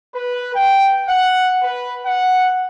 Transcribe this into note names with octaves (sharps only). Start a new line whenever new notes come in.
B4
G5
F#5
B4
F#5